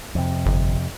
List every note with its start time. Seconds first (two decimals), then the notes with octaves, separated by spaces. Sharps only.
0.15 F2 C3
0.46 G1